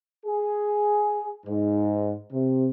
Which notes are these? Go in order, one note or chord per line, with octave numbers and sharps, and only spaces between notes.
G#4
G#2
C3